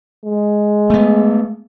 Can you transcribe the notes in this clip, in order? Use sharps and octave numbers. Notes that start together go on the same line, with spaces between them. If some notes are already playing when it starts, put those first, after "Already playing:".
G#3
A3 B3